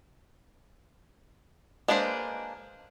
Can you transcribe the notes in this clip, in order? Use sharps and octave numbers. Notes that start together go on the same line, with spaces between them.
G#3 A#3 D4 B4 C5